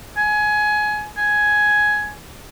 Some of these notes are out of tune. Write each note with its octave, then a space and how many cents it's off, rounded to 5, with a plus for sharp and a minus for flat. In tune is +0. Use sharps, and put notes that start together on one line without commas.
G#5 +20
G#5 +10